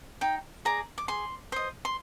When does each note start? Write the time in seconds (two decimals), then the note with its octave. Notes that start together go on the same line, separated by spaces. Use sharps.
0.21 D#4 G5
0.65 G#4 D5 A#5
0.98 D6
1.08 G#4 C6
1.52 C5 D#5
1.85 C6